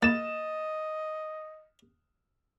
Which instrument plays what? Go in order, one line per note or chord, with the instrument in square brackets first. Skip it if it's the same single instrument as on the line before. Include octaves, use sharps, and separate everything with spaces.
[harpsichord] A#3 [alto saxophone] D#5 [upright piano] A6 E7